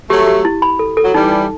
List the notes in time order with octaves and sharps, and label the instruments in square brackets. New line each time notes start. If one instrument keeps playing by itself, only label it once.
[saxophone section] F#3 A3 [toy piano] G4
[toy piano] G4
E4
B5
A4
A4
[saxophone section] F#3
[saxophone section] E3 G3 [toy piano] D#4
[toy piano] D#4